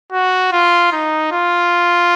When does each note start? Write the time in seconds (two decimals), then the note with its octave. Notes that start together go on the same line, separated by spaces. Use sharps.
0.12 F#4
0.52 F4
0.93 D#4
1.32 F4